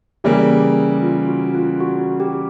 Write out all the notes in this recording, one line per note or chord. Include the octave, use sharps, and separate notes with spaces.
C#3 E3 G3 A#3 G4
G#4
F4
F#4
F4
F#4
G4